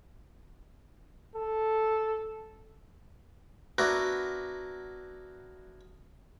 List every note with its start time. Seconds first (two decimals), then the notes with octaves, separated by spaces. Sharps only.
1.35 A4
3.78 B3 D4 E4 F#4 A#4 B4